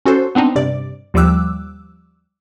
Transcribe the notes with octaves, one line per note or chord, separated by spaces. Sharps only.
C#4 F#4 A4 C5
B3 C4 D4 D#4
G2 C3 D5
D#2 F3 G3 D6 E6 F#6